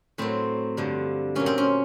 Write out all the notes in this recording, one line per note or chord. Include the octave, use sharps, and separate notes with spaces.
A2 F#3 C4
G2 D3 F3
A#2 F#3 C#4
C4
C#4